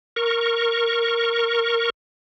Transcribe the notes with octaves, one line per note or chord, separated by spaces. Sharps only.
A#4 C#6